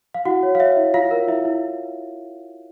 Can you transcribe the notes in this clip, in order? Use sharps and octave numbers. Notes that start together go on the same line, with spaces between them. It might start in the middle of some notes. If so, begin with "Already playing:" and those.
F5
E4 F#4 F#5
C#5
F5
C#5 E5
E4
E4 F4 F5
A#4
E4 E5
E4